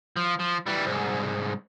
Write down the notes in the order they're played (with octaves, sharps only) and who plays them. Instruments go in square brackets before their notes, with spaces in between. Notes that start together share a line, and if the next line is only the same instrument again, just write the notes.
[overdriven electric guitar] F3
F3
E3 G3
C2 G#2